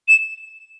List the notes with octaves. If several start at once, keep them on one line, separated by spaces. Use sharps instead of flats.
E7